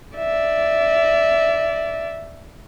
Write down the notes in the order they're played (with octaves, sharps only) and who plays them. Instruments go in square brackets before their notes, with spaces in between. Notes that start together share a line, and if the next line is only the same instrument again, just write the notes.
[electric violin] D5 E5